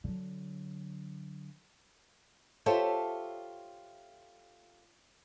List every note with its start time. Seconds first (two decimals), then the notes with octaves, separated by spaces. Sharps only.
0.04 D3 F#3
2.66 F4 G4 A4 C5 C#5 E5